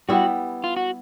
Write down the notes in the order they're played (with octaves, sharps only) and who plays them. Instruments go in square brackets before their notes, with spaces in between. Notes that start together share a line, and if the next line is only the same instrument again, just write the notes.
[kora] G3 B3 E4 [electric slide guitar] F#4
[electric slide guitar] F4
F#4